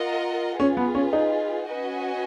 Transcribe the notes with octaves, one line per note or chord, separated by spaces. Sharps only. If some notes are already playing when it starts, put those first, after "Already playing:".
Already playing: F4 A#4 D#5 F#5
C#4 F4 G#4 B4
B3
C#4
D#4
C#4 F#4 B4 D#5 G#5